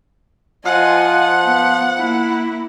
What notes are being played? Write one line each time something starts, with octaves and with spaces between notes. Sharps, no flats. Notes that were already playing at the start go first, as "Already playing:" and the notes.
F3 F4 D#5 F#5 G#5
B3
A#3 E4